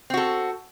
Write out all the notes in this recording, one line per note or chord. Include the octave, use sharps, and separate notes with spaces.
C4 F#4 A4